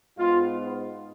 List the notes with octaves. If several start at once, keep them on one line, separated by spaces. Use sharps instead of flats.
G#2 G#3 B3 F4